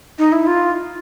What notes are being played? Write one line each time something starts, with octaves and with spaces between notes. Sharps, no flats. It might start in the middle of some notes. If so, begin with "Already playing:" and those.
D#4
E4
F4